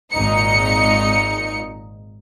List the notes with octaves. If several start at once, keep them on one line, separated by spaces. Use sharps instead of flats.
G#1 A#2 D#4 C#7